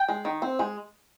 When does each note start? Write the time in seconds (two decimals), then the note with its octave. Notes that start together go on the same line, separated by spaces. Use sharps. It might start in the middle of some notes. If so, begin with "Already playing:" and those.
Already playing: G5
0.08 G#3
0.25 D#3
0.42 C4
0.59 G#3